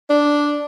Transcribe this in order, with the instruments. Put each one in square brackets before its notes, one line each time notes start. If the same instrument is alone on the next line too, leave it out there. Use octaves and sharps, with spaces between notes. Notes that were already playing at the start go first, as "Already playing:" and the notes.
[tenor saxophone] D4